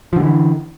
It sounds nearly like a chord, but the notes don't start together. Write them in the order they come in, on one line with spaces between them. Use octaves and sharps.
F3 D3 G3 E3